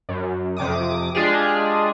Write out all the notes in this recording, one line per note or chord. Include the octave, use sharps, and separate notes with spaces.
F#2
F2 C3 D6 D#6
G#3 D4 F4 G4 G#4